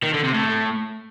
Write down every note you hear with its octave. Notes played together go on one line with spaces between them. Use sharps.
D#3
D3
C3
A2